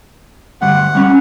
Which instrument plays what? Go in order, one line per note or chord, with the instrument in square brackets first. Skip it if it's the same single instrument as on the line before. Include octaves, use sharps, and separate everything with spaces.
[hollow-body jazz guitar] D2 G2 G3 [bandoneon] F#5
[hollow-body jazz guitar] G3 C#4 B5